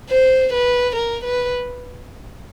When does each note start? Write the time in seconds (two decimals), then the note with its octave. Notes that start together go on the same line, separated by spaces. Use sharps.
0.10 C5
0.53 B4
0.96 A#4
1.24 B4